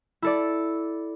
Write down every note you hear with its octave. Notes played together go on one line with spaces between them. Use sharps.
E4 A4 D5